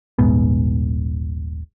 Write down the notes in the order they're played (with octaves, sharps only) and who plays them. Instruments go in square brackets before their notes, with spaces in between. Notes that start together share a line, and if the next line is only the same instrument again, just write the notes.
[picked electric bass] D#1 A#1 G#2 B3